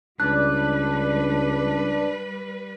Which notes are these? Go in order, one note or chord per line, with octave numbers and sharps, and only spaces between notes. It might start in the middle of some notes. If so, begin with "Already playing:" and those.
C#2 G3 D4 B4 F#6